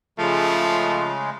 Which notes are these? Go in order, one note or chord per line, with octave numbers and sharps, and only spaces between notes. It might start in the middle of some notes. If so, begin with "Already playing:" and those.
C#3 F3 G#3 A3